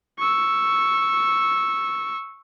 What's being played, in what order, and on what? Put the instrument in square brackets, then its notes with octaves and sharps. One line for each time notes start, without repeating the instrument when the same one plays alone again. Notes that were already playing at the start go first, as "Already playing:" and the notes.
[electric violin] C#6 E6